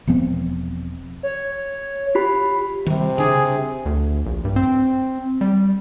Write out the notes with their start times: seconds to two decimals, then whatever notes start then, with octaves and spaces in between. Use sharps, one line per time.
0.07 E1 F3 B3 C4
1.23 C#5
2.15 F4 G4 B5
2.86 C3 D#3 G3
3.18 C#3 D4 G#4
3.86 D2
4.26 A#1
4.45 G2
4.56 C4
5.41 G3